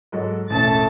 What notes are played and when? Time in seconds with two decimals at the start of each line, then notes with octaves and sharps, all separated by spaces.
0.12 G#2 F#3 A4
0.50 E1 A1 A3 A5 A6